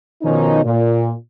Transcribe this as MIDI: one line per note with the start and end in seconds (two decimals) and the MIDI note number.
0.23 0.62 47
0.23 0.62 51
0.23 0.62 53
0.23 0.62 61
0.23 0.62 63
0.64 1.12 46